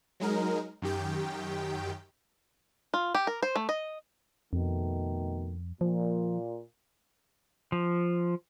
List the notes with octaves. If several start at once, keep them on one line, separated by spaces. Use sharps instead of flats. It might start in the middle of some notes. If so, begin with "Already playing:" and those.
F#3 G#3 D#4 A#4
F#2 D#3 G4 G5
F4
G4
A#4
C5
A3
D#5
F2 B2 D#3 A3
A#2 F3
F3